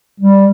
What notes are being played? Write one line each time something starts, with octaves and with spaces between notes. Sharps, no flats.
G3